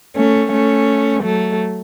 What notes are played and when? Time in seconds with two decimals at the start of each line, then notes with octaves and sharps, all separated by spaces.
0.16 A3 C#4
0.52 A3 C#4
1.23 F#3 A3